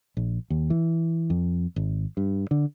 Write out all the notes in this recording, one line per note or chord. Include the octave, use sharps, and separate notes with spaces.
A#1
D#2
E3
F2
G#1
G2
D3